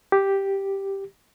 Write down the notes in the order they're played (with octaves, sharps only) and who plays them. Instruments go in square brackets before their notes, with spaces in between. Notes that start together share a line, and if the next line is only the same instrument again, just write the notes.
[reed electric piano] G4